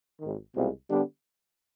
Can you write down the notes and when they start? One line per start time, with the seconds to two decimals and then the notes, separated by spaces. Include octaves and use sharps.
0.20 G#1 G#2 D#3
0.55 C2 B2 G#3 C4 F4
0.89 D3 G3 B3 D4 G4